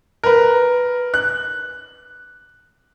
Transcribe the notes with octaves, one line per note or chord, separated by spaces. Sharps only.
A#4 B4
F#6